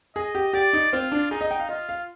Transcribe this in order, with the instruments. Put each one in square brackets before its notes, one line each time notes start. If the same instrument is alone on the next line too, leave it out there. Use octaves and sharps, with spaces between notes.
[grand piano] G#4 [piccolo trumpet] D#5
[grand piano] G4
[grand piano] G4 [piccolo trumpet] D5
[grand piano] D#4
[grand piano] C4 [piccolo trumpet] F4
[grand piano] D4
[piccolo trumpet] D#4 [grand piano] G#4
[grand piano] D#5
G5
F5
[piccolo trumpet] F4 [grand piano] D#5
[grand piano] F5